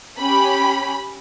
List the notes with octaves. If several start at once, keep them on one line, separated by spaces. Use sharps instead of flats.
C#4 G4 B5